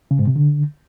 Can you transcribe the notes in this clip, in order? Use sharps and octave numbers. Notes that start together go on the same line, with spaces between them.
C#3
G#2
C3
D3